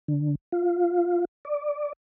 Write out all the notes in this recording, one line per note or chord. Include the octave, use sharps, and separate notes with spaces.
D3
F4
D5